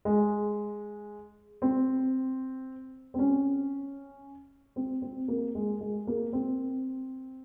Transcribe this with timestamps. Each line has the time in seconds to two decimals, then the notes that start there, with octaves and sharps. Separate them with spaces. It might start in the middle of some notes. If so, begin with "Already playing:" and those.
0.05 G#3
1.62 C4
3.14 C4
3.19 C#4
4.76 C4
5.02 C4
5.28 A#3
5.55 G#3
5.81 G#3
6.07 A#3
6.33 C4